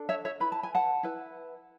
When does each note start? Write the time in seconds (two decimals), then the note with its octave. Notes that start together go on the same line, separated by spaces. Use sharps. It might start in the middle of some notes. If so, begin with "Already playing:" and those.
Already playing: D4 A4
0.09 C#5 E5
0.25 C#5 E5
0.40 E4 B4 B5
0.52 A5
0.63 G#5
0.75 F#5 A5
1.03 E4 B4